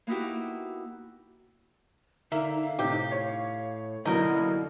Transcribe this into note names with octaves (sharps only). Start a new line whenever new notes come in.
A#3 B3 D#4 E4 F#4 G4
D3 A#3 D#4 E5
F5
A2 C3 D#4 G4
C#5
F#2 B2 D3 A#3 D#4 E4 A#4